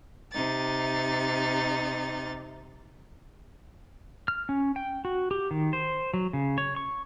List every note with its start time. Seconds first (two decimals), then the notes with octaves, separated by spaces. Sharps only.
0.32 C3 D#4 A6
4.28 F6
4.49 C#4
4.76 G5
5.05 F#4
5.31 G4
5.51 D#3
5.73 C5
6.14 F#3
6.33 C#3
6.58 C#5
6.76 C#6